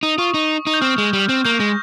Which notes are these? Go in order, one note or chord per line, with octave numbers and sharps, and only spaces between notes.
D#4 D#6
F4 C#6
D#4
D#4 D#6
G6
C4 F6
G#3
G3
C4 G6
A#3 G6
G#3 A#6